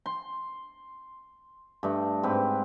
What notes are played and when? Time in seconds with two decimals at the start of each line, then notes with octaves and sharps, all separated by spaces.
0.06 C6
1.83 G2 A3
2.23 G#2 C4 B4